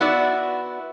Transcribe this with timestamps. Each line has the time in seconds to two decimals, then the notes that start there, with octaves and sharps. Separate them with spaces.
0.01 B3 E4 F#4 B4 D5 E5